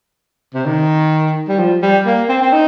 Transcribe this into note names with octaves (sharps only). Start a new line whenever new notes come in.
C3
D#3
G3
F3
G3
A#3
C4
C4
D#4